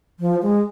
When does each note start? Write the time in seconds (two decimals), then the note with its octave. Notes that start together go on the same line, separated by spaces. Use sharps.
0.20 F3
0.42 G#3